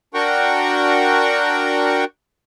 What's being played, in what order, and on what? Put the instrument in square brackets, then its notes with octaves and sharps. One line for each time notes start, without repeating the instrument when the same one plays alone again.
[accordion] D4 F#4 A#4 F#5 G5 C#6